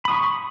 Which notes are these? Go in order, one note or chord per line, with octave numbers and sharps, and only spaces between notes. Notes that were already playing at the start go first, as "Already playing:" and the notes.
B5 C#6 D#6